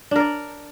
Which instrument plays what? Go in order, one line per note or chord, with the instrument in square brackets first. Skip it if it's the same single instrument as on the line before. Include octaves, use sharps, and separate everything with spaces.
[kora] D4
A#4
D5